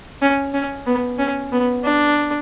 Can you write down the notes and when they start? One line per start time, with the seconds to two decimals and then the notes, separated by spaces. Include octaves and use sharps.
0.22 C#4
0.54 C#4
0.87 B3
1.19 C#4
1.52 B3
1.84 D4